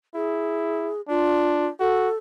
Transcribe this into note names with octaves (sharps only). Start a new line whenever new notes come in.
E4 G#4
D4 F4
F#4 A4